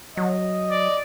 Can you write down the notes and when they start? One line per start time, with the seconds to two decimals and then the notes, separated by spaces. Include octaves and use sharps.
0.17 F#3 D#5
0.70 D5